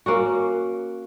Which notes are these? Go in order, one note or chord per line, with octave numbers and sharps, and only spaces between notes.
A#3 C#4 F#4